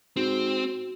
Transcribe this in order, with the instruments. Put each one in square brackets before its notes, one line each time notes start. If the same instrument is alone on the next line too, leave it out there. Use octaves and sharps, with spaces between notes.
[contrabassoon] G#2 [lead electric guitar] C4 [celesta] F#4